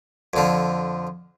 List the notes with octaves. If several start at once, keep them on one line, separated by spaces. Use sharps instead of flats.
F2 D3 F3